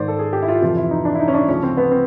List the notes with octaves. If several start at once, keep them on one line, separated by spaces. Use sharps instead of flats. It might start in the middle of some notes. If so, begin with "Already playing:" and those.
Already playing: G#2 D#3 C5 D5
A4
G#4
G4
E4
F4
F2 C3 E3 F4
E4
D#4
D4
E4
D#4
C#4
D4
D2 C#3 F3 C#4
C4
B3
C4